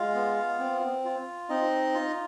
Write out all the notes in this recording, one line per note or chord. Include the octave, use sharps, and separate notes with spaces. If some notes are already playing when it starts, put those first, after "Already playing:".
Already playing: G#3 F4 F5
B3
C4
F4
C4 D#4 D#5
F4